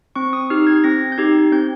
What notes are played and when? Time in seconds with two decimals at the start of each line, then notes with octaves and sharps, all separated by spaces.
0.16 C4 C#6
0.33 D#6
0.50 D#4 G4 F6
0.67 G#6
0.84 C4 A#6
1.12 G6
1.18 D#4 G4 G#6
1.52 C4 G6